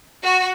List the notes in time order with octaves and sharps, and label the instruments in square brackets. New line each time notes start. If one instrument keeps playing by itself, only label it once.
[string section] F#4